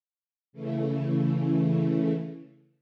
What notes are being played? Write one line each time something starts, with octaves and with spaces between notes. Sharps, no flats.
C#3 E3 A3